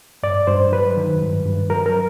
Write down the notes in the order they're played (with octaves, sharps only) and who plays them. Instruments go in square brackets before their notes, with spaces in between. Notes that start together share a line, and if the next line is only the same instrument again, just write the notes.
[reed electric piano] G2 D5
G2 C5
F#3 B4
D#3
G2
G2
F#3 A#4
A#4